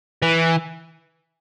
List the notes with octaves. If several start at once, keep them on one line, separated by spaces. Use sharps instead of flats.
E3